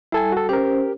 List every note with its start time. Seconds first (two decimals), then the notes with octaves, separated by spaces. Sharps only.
0.12 G3 E4 A4 G#5
0.32 F#4 A4
0.49 C#4 G4 A#4 C5